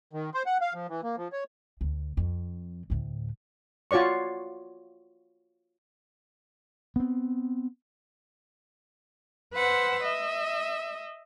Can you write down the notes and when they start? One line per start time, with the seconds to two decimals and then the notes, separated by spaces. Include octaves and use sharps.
0.13 D#3
0.34 C5
0.46 F#5
0.61 F5
0.74 F3
0.89 E3
1.03 A#3
1.17 F3
1.32 C#5
1.81 D2
2.17 F2
2.90 D2 A2
3.91 F4 F#4 C#5 D5 C#6
6.96 B3 C4
9.53 B4 C5 F#5 E6
10.01 D#5 E5